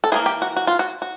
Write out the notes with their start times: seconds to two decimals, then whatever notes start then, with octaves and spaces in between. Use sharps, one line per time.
0.04 A4
0.12 E3 G3 A#3 G#4
0.26 G4
0.42 F#4
0.56 F#4
0.67 F4
0.79 F#4
1.02 F#4